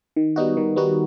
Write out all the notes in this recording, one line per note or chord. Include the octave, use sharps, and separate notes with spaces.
D#3
G3 B3 D#4 F#4
D#3
G3 B3 D#4 F#4